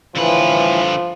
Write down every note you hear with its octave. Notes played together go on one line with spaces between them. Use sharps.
A2 D3 E3 F3 B4